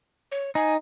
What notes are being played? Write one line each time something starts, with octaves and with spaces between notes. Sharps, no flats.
C#5
D#4 G#5